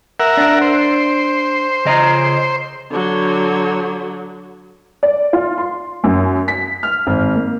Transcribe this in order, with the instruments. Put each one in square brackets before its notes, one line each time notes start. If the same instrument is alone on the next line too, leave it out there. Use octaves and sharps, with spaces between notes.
[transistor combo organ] A#4 E5 F#5
[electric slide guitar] D4
[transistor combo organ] C5
[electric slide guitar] C#3 D#5 A#5
[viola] D3 F#3
[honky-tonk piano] D5
F4
C6
F#2
B6
F6
G#1
A#3